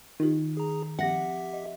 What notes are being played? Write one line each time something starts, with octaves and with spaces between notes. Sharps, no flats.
D#3 D#4 F4 G4
G#4 A#5
F3 C4 G4 E5 F#5 A#6
D#5